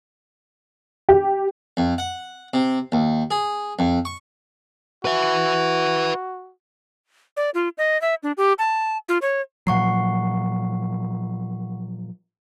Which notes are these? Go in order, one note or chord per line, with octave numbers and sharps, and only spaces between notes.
G4
F2
F#5
C3
D#2
G#4
F2
C#6
F#4 B4 E5
D5
F4
D#5
E5
D4
G4
A5
F4
C#5
A#2 F3 F#3 F#5 C#6 C7